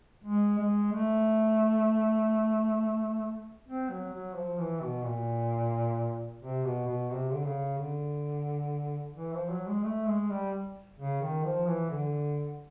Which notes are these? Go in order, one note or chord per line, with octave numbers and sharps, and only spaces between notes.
G#3
G#3
A3
C4
F#3
F#3
F3
E3
B2
A#2
C3
B2
B2
C3
D3
C#3
D3
E3
F3
F#3
G#3
A3
G#3
G3
C#3
D#3
F3
E3
D3